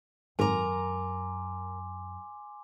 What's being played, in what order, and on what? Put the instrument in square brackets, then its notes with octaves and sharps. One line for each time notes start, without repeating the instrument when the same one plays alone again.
[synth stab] G#1 [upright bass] F#2 [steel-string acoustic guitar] A#4 A#5 [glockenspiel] G#5 C6 D6